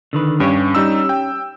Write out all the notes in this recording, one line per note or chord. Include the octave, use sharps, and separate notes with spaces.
D3 D#3 B4
G2 C#4 G4 C#5
G3 D#4 E6
G5